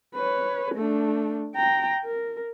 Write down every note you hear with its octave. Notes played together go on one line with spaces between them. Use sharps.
B4 C#5
A3 D4
G5 A#5
A#4